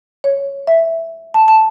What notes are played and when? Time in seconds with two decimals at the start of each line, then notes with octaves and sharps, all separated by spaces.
0.24 C#5
0.67 E5
1.34 A5
1.48 A5